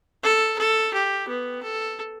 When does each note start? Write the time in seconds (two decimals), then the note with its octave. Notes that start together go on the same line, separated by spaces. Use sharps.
0.23 A4
0.58 A4
0.93 G4
1.28 B3
1.63 A4